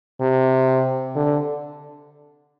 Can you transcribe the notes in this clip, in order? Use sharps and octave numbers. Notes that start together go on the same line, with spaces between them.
C3
D3